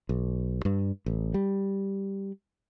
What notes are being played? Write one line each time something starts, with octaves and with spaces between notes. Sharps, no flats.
B1
G2
A1
G3